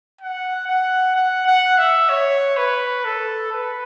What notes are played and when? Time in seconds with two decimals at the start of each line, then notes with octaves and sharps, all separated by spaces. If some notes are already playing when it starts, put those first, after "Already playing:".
0.21 F#5
0.67 F#5
1.16 F#5
1.47 F#5
1.78 E5
2.09 C#5
2.57 B4
3.05 A4
3.52 B4